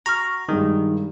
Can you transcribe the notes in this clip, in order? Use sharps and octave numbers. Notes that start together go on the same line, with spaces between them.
F#4 A#5 C#6 F6
G2 D#3 G3 G#3